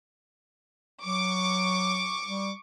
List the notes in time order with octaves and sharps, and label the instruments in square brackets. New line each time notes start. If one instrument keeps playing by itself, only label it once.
[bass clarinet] F#3 [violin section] C#6 D6
[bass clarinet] G3